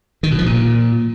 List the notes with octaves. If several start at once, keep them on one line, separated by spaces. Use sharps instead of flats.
D#3
B2
F3
A#2